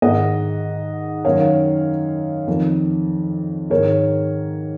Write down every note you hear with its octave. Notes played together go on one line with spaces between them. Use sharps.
G#2 D#3 D#5 F#5
F#2 D#3 C#5 F5
F2 D#3
G#2 D#3 A#4 C#5